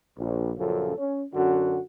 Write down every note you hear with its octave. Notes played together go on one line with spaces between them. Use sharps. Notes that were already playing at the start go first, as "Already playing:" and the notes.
A#1
A#1 F#2 C#3 F3 A4
C#4
F#2 D3 C#4 F#4